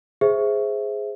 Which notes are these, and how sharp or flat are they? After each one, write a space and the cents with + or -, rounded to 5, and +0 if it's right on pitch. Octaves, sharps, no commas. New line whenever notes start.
G#4 +0 C5 +0 E5 +0